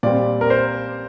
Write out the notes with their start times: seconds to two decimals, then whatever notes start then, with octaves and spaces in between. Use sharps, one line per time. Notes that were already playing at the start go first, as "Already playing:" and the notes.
0.03 A#2 G3 C4 D5
0.41 A#4
0.50 C5